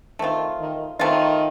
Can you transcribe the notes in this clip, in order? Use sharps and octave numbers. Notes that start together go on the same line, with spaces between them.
D#3 A3 C4 F4
D#3
D#3 A3 C4 F4